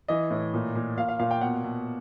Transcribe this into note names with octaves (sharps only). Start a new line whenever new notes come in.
E3 D#5
A2
A#2
A#2
A#2 F5
F5
A#2 F5
G5
B2 F#5
B2